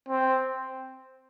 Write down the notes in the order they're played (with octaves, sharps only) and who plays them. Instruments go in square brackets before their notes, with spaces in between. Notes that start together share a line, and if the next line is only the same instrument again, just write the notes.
[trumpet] C4